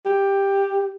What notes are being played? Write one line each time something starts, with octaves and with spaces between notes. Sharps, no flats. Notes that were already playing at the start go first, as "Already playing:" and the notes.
G4